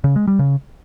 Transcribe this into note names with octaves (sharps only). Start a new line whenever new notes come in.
C#3
G#3
G3
C#3